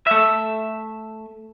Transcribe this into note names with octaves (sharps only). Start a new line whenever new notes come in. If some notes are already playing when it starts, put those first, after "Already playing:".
A3 E5